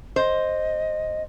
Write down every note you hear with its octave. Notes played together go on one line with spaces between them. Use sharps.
C5 D#5